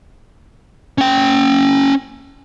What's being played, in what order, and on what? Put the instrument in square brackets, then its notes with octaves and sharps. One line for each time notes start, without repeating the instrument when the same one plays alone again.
[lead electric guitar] C#4 G5